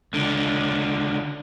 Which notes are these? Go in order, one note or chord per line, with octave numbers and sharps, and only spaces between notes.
C#2 D3